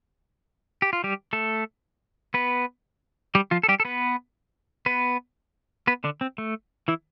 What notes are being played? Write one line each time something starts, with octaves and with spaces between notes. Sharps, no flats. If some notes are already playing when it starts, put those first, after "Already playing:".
G4
F4
G3 G4
A3 A4
B3 B4
G3 G4
F3 F4
A4
G3 G4
A4
B3 B4
B3 B4
B3 B4
D3 D4
C4
A3
E3 E4